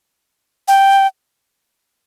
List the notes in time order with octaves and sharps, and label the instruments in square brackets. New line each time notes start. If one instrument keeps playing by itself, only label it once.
[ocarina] G5